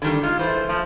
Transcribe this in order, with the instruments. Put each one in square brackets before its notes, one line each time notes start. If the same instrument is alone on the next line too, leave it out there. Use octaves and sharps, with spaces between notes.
[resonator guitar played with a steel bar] D3 D#3 G3
[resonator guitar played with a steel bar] G#3 [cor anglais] F4
[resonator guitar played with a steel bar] E3 A3 [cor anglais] C5
[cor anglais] F3 [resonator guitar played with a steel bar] A3